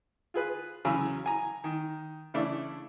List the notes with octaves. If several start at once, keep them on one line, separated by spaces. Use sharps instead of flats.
F4 G#4 B4
E2 C#3 F#3 G#5 B5 E6
G#5 A#5
D#3
C#3 E3 A3 D4 E4